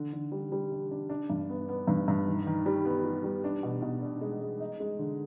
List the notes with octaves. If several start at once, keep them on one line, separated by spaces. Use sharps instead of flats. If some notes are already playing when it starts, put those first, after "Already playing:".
Already playing: D3
D3
G3
G3
D4
D4
D4
G2
B3
B3
G2
G2
D#3
D#3
G3
B3
G3
G3
D4
B2
B2
D4
G#3
G#3
D#4
G#3
D3